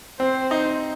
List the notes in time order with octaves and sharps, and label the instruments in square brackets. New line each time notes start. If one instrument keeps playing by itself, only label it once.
[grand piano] C4 [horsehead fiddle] C5
[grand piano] D#4